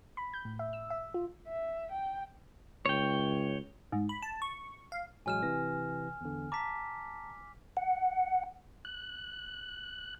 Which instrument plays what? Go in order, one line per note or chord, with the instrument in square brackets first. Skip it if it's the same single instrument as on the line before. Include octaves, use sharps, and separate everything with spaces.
[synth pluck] B5
G6
A2
E5
E6
E5
F4
[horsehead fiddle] E5
G5
[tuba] C#2 [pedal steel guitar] C#5 G5
[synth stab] G#2
B5
A5
C#6
F5
[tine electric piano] A1 F#3 G#3 [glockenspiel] G#5 F6 E7
[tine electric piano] C3 E3 A#6
E2 D3
[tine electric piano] A5 A#5 [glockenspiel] D6 B6
[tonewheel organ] F#5
F#6